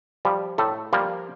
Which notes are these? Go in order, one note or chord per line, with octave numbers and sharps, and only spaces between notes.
F3 G3
A2 A3
F3 G3 A#3